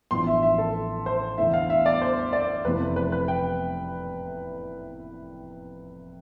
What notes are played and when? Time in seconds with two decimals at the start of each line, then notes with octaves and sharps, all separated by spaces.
0.11 A1 A2 F3 B3 D4 C6
0.27 E5
0.43 E5
0.58 A4
1.06 C5
1.38 E2 D3 A3 E4 E5
1.54 F5
1.70 E5
1.86 D5
2.01 C5
2.33 D5
2.65 F1 F2 C3 E3 A3 B4
2.96 B4
3.12 B4
3.28 G5